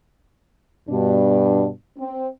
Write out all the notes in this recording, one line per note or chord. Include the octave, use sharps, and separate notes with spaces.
G2 B2 D4
C4